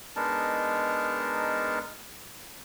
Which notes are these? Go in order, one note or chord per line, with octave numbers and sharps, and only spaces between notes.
G#3 B3 D4 D#4 A#4 A5